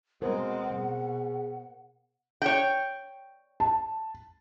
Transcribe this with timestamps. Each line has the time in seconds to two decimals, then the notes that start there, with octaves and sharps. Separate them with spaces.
0.22 B2 G#3 C4 A#4 C5 F#5
0.74 B2 G#4
2.42 C#5 G5
3.60 A5